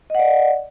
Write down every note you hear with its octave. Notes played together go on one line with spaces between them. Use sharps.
D5 D#5 F#5